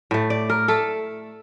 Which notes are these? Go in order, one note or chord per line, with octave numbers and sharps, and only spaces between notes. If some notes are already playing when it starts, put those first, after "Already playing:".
A2 A3
D5
A#4
A3 A4